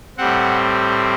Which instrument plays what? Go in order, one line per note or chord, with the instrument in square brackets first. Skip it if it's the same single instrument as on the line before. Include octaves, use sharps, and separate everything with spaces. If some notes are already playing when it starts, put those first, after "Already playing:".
[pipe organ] A2 G3 C4 F#5